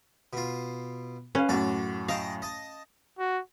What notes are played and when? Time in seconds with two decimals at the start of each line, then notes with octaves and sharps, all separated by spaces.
0.33 B2 F4
1.35 C#4 B4 F5
1.49 F#2 A2 F#4 D5
2.08 D#5 F5 G5 A5
2.42 D#5 A5
3.19 F#4